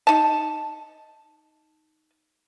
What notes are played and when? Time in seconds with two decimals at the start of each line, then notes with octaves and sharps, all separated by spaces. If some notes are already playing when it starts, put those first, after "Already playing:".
0.07 D#4 A5